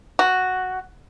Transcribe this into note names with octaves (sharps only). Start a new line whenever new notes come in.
F#4